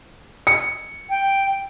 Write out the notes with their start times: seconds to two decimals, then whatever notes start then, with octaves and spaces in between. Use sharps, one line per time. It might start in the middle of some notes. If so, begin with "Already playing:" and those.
0.47 C#7
1.09 G5